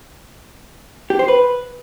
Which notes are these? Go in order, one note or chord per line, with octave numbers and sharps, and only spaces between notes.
G4
C5
B4